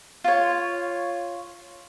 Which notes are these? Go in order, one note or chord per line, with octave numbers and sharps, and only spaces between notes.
F4 C#5